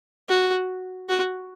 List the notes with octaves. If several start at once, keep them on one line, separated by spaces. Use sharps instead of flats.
F#4
F#4